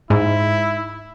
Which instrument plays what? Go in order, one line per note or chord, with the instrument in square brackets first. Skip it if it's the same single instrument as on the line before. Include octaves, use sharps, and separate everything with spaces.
[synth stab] G#2 [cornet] E4